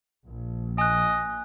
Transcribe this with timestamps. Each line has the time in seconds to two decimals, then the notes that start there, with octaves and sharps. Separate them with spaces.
0.25 A#1
0.78 D#5 G#5 F#6